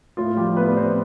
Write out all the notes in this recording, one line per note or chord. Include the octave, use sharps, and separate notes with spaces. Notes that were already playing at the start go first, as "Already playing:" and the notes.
A2 F4
F3 G3 G4
A2 B3 B4
D5
F3 C4 C5